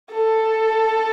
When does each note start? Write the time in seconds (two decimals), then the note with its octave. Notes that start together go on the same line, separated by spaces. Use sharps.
0.12 A4